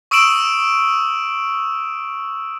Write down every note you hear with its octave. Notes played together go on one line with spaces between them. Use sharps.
C#6 D#6 E6 D7 E7 F#7